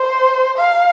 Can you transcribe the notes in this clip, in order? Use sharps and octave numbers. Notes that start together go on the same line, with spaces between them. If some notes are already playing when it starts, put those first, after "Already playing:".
Already playing: C5
F5